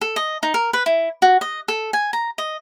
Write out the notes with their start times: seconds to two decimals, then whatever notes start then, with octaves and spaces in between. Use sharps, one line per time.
0.01 A4
0.16 D#5
0.43 D#4
0.54 A#4
0.73 B4
0.86 E4
1.22 F#4
1.41 D#5
1.68 A4
1.93 G#5
2.13 A#5
2.38 D#5